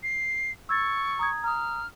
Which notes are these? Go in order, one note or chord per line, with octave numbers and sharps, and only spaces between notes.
C7
C#6 E6 G#6 A6
A#5 D#6 G#6
A#5 D#6 F6